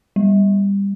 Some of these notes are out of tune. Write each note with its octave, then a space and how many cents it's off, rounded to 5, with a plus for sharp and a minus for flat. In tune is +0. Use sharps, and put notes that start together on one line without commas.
G3 +20